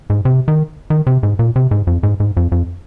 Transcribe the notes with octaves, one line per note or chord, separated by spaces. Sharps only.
G#2
C3
D#3
D#3
C3
G#2
A#2
C3
G#2
F2
G#2
G#2
F2
F2